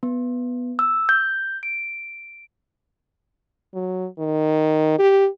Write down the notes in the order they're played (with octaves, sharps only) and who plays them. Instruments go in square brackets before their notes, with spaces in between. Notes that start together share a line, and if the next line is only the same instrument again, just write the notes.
[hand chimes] B3
E6
G6
D7
[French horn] F#3
D#3
G4